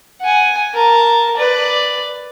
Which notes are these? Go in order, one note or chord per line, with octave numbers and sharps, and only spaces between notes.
F#5 G#5
A#4 A5
B4 D5